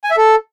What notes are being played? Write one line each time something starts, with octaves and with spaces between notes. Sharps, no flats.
G#5
E5
A4